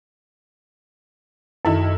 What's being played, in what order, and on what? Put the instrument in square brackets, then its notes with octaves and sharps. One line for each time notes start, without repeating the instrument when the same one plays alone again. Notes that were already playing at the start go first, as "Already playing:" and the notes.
[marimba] F#2 [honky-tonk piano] D#3 E4 A4